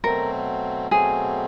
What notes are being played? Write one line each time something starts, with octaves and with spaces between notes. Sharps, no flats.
B2 F#3 A3 C4 A#4
B2 F#3 A3 C4 G#4